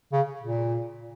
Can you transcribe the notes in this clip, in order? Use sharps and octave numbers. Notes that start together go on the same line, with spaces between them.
C#3
A#2